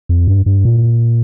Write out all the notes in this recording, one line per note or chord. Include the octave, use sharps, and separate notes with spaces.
F2
G2
G2
A#2